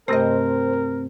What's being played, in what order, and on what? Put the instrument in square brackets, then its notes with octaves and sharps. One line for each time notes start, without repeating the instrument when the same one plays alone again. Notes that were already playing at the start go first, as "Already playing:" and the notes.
[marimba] G2 C3 A3 [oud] C4 D#5 [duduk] A#4 [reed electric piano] C5